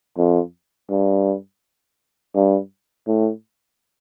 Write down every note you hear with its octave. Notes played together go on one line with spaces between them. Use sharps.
F2
G2
G2
A2